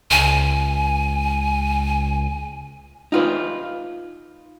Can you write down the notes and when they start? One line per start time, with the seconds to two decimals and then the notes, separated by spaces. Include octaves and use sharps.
0.11 C#2 G#5
3.12 D#4 F4 B4